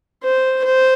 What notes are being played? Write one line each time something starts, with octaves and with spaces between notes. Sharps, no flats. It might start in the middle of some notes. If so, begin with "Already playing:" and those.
C5
C5